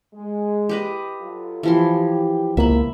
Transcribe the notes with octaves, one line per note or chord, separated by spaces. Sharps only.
G#3
G4 B4 D#5
F#3 F4 A4
E3 F3 G4 C6
C#2 B2 F3 A#3 E4 E5 B5